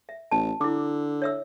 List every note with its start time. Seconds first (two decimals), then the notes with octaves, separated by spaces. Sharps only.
0.09 E5
0.31 A1 A5
0.61 D3 E4 D6
1.22 C#5 E5 E6